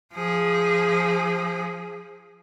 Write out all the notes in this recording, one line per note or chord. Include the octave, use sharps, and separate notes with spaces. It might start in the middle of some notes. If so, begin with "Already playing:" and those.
F3 G#4